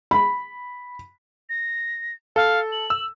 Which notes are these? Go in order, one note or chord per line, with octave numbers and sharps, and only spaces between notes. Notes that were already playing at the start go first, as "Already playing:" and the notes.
B5
A#6
A4 F5
F#7
E6